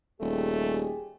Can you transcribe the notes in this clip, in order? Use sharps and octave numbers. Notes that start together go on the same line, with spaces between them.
D#1 A3 G4 G#4